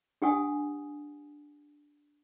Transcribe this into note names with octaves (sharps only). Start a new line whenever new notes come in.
D4 G4 F#5 G#5 D#6